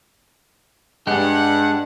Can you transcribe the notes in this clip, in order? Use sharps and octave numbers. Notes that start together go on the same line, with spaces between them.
G2 G#3 D4 F#5